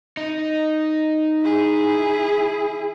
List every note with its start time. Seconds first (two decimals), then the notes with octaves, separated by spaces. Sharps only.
0.17 D#4
1.42 E4 G#4